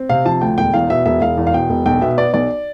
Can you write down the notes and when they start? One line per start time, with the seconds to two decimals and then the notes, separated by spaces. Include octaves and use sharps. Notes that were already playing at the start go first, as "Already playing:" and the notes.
Already playing: C4
0.09 C3 F5
0.25 F3 A5
0.41 D2 G5
0.58 E1 G5
0.73 E2 F5
0.90 B2 E5
1.06 E1 E5
1.22 E1 F5
1.37 E2
1.47 F5
1.54 B2 G5
1.69 E1
1.86 B1 G5
2.02 B2 E5
2.18 B3 D5
2.34 B1 D5